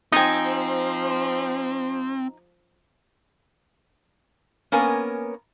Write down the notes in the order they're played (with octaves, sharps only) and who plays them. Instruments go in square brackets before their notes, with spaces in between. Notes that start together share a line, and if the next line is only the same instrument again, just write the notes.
[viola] F3 [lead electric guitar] C4 [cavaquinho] D#4 G#5 [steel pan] G5 D#6
[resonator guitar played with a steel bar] A#3 B3 C#4 A#4 G#5